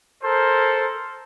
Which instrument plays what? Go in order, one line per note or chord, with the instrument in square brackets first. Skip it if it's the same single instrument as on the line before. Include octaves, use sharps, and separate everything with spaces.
[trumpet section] A4 A#4 C5